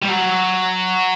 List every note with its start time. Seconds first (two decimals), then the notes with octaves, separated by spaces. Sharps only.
0.02 G3
0.09 F#3